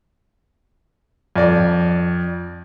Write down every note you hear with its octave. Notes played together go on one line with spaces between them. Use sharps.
F2 D5